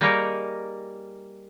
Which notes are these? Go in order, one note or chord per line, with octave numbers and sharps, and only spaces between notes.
G3 A#3 D#4 G#4 A#4 C#5